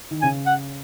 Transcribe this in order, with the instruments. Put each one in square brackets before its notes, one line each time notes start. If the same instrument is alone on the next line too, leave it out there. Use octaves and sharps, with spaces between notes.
[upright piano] D#3
[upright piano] C#3 [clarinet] G#5
[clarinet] F#5